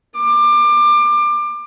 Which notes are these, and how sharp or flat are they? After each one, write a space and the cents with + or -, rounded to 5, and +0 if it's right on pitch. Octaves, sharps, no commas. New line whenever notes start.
D6 +25